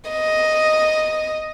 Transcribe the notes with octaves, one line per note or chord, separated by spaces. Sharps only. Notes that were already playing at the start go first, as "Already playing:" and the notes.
D#5